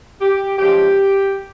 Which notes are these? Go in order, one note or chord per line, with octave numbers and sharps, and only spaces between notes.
G4
C#3 F3 G#3 G4